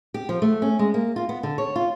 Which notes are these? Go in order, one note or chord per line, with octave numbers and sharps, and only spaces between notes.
G4
F3
A3
C#4
G#3
A#3
F4
B3
D3
C#5
F4